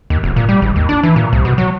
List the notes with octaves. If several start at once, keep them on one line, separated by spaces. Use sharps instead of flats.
D#2
F1
A#2
G3
G#1
D#2
D4
E3
A#2
C2
B2
F#3